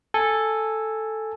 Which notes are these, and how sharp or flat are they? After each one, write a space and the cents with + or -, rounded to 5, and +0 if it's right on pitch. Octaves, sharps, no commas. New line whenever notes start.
A4 +0 G#5 -5